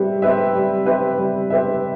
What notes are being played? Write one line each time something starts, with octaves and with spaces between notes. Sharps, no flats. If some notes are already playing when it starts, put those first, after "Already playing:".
Already playing: G3 C4 G4 B4 E5
C4 G4 B4 E5
G3
C4 G4 B4 E5
G3
C4 G4 B4 E5